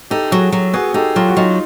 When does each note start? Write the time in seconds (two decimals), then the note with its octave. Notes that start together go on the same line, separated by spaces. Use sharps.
0.10 D#4 G4 A4
0.31 F#3 F#4 G#4
0.52 F#3
0.73 B3 F#4 G#4
0.94 D#4 G4 A4
1.16 F#3 F4 G4
1.28 F#4
1.37 F#3 D#4 F4